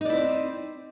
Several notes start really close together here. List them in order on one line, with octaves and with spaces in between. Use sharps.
D#4 D5 E4 C4